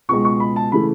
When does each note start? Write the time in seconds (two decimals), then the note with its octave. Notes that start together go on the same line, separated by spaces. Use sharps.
0.09 C#2 B2 G#3 C#6
0.25 C#6
0.40 B5
0.56 A5
0.72 C#3 E3 A3 B5